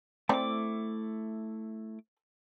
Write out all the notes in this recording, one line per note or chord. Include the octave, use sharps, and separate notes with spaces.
A3 C4 E4 D5 D6